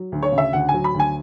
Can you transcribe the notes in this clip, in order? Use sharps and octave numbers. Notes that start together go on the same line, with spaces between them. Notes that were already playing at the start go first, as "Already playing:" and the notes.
Already playing: F#3
D2
C#5
C#3
E5
D2 F#5
G#5
F#3
B5
D2
G#5